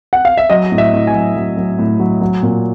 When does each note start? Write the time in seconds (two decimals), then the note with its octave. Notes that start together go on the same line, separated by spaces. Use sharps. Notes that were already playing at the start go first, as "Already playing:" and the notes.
0.13 F#5
0.25 F5
0.37 E5
0.50 F#3 D#5
0.72 A2
0.78 E5
0.93 A2
1.07 G#5
1.15 F#3
1.36 F#3
1.57 F#3
1.79 A2
2.00 F#3
2.21 F#3
2.43 A#2